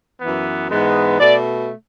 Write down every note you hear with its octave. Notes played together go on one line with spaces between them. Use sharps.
F#2 E3 B3
G#2 E3 G#3 B3
B2 A3 D5